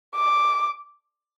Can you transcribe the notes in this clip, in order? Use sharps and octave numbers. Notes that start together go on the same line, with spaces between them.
D6